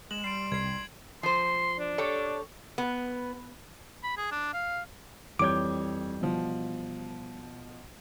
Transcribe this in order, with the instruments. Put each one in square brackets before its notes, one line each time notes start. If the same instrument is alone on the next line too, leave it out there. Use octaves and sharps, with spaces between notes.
[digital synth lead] G#3 [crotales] E7 F#7
[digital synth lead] G3 [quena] C6 [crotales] C7 D7
[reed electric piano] C2 [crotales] G#6 C7
[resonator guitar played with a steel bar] F3 C5 [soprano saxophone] C6
[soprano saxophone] D4
[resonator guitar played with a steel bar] G4 A4 C#5
B3
[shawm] B5
G#4
D4
F5
[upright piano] F2 C#5 G6 [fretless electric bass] E3 G3 [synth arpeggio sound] D6
[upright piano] B2 F3